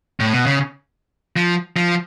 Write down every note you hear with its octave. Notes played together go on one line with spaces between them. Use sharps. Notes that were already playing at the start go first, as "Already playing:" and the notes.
A2
B2
C#3
F3
F3